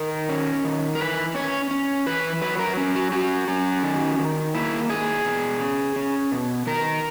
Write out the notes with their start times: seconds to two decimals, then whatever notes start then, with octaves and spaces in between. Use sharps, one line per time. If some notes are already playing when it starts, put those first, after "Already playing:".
Already playing: D#3 A#4
0.29 C#4
0.65 D#3
0.95 A#4
1.00 E3 B4
1.35 C#4 C#5
1.71 C#4
2.06 E3 B4
2.42 F#3 B4
2.59 A#4
2.77 C#4
2.95 F#4
3.12 C#4 F#4
3.48 C#4
3.83 D#3
4.19 D#3
4.54 A#3 E4
4.89 D#3 G#4
5.25 B2
5.60 C#4
5.96 C#4
6.31 B2
6.67 D#3 A#4